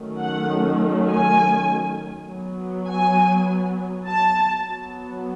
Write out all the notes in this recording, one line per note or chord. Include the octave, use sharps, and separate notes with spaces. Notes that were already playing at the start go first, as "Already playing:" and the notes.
Already playing: D#3 F#3 A3 C#4
F#5
G#5
F#3 B3
G#5
A5
F#3 B3